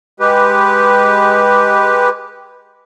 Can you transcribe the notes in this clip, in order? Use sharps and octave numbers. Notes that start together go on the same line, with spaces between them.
G#3 G4 B4